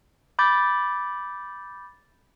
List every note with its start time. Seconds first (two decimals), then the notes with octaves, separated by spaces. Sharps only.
0.39 B5 D6 G6 A6